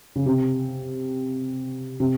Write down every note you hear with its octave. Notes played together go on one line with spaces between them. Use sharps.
C#3
C3
C3